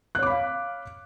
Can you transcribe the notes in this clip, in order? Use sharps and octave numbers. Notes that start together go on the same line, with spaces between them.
C#5 F5 B5 D6 F#6